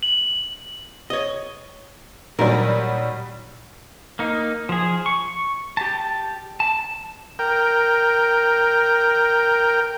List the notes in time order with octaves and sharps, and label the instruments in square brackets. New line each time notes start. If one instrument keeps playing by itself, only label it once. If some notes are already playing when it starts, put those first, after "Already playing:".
[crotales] F#7
[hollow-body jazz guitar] C#5 D#5
[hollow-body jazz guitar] A#2 A#4 [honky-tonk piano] D#3 F#3 G3
[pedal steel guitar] A#3 D#4
F3 G#4
C#6
G4 A5
A5
[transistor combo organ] A#4 G5